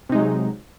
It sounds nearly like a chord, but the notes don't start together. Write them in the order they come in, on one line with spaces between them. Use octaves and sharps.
C3 D#4 G#3 F#3